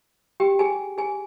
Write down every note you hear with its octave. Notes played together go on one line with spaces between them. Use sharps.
G4 G5
G#4 G#5
G#4 G#5